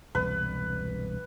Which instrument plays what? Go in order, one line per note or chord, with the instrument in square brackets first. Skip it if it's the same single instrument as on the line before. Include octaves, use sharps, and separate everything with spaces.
[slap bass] E1 C2 G2 [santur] B4